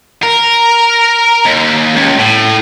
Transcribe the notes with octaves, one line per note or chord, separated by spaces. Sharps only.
A#4
D#2
C#2
A2